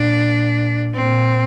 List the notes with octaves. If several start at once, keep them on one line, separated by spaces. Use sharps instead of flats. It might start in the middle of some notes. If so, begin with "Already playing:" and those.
Already playing: A#2 D4
A#2 C4